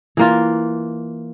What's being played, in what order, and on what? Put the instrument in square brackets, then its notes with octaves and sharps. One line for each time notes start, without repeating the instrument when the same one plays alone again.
[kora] E3 A#3 F4